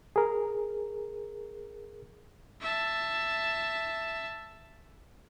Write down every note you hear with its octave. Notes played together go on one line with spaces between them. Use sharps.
G#4 A#4
E5 A5